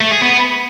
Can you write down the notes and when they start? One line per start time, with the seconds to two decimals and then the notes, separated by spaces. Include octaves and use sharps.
0.01 A3
0.11 G#4
0.22 B3